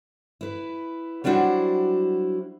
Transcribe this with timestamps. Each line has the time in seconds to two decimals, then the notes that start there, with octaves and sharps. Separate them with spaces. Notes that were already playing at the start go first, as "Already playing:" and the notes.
0.41 E4 B4
1.24 F#3 G3 D4 E4 F#4 C5